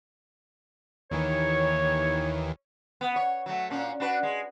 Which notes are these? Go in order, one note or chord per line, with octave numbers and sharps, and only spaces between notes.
D#2 D#3 E3 C#5
B3
C#5
F#3 A3
A#2 C#4 D4
D4 F#4 B4
G#3